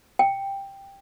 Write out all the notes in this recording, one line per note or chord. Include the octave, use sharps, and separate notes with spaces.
G5